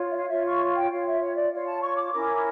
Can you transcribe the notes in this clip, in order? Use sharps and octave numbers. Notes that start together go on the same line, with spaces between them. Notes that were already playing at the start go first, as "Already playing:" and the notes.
Already playing: F4 C#5
E5
F5
F4 C#5 E5
C#6
G5
F4 C#5 F5
E5
C#5
D5
F4 C#5 F5
A5
C#6
D6
C#4 E4 A#4 D6